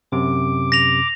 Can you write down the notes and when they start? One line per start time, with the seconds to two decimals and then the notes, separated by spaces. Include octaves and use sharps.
0.12 F#2 C3 D6
0.72 A#6 F7